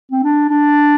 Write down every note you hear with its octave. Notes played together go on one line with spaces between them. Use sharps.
C4
D4
D4